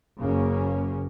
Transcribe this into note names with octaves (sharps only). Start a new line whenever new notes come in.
F#1 C#3 A#3 C#4